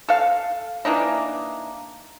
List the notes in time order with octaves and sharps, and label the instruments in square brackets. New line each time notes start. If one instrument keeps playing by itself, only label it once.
[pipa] A4 F5
E3 A#3 D4 D#4